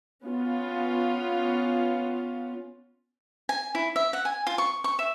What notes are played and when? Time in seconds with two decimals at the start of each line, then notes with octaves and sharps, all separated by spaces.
0.24 B3 C#4 F4
3.49 G#5
3.75 E4
3.96 E5
4.13 F#5
4.25 G#5
4.47 F4
4.58 C#6
4.84 C#6
4.99 E5